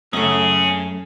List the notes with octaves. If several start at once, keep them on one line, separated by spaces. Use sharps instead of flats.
F#2 A3 C#4 G#4